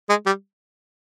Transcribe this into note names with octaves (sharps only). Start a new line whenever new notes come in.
G#3
G3